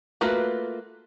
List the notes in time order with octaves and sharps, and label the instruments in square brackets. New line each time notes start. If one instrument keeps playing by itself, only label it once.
[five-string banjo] A3 A#3 F4 F#4 B4